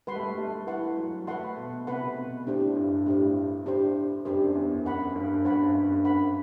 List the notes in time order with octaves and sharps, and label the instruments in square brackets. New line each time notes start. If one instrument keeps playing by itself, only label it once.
[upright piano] G3 [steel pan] B4 F#5 C6
[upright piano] A3
G3
A3
[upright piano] E3 [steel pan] B4 F#5 C6
[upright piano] F#3
[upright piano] A3 [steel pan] B4 F#5 C6
[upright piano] B2
[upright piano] C3 [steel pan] B4 F#5 C6
[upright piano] B2
[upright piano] A2 [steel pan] D4 G4 C5
[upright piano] G2
[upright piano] A2 [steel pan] D4 G4 C5
[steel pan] D4 G4 C5
[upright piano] F#2 [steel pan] D4 G4 C5
[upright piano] E2
[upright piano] F#2 [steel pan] C5 F#5 B5
[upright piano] G2
[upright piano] G2 [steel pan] C5 F#5 B5
[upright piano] G2
[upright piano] F#2 [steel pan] C5 F#5 B5